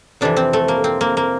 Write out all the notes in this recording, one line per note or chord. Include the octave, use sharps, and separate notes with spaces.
F2 C3 E3 D4
C4
A3
A#3
C4
A#3
A#3